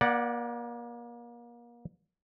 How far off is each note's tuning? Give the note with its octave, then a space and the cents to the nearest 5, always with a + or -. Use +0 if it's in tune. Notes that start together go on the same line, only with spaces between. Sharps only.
A#3 +35 D5 +0 F#5 +0